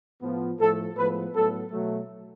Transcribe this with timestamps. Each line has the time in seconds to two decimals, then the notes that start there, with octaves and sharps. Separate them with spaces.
0.22 A2 F3 B3
0.59 A2 F3 A3 A4
0.96 A2 F3 G#3 B3 B4
1.34 A2 F#3 B3 A4
1.71 B2 F#3 A3